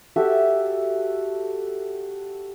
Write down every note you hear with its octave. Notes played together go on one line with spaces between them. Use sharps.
F#4 G4 A4 E5